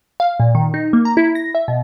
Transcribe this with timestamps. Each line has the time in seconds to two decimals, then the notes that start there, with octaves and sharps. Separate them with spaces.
0.20 F5
0.40 A#2
0.55 D#3
0.74 D#4
0.93 A#3
1.05 A#5
1.17 E4
1.35 A#6
1.55 E5
1.68 B2